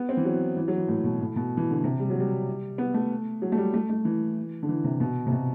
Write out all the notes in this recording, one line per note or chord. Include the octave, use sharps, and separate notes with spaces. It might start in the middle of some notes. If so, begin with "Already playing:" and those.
Already playing: B3
C4
E3
F#3
E3
F#3
E3
A2
B2
A2
B2
E3
D3
C3
G3
F#3
G3
B3
A3
F#3
A3
G3
A3
A3
E3
D3
E3
C3
B2
C3
B2